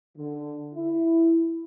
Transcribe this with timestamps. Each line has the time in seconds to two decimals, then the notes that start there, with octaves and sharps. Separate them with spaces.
0.17 D3
0.74 E4